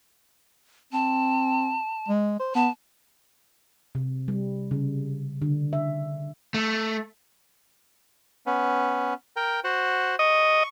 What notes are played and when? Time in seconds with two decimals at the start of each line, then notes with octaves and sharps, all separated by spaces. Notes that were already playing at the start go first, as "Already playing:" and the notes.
0.93 C4 A5
2.08 G#3
2.39 C5
2.55 B3 A5
3.95 C3
4.28 G3
4.71 C#3
5.42 D3
5.73 E5
6.54 A3
8.46 B3 C#4
9.36 A#4 G5
9.64 F#4 C5 F#5
10.19 D#5 C#6